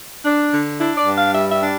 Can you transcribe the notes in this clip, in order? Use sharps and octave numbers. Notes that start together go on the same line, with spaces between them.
D4
D3
D4 E4
D5
G2
F5
G3 E5
E5
D4